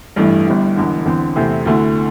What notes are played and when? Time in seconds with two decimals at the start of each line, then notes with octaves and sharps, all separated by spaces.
0.16 A1 G2 E3 A3 E4
0.46 G1 G2 G3 E4
0.76 E1 E2 D3
1.05 E2 D3 C4
1.36 E2 C3 A3 C4 E4
1.65 D2 D3 A3 E4